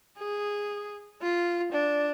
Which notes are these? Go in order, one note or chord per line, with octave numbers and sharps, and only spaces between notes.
G#4
F4
D4